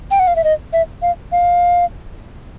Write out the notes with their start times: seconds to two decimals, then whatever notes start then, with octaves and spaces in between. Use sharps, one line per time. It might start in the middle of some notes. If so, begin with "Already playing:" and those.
0.11 G5
0.20 F#5
0.27 F5
0.36 E5
0.44 D#5
0.73 E5
1.02 F5
1.32 F5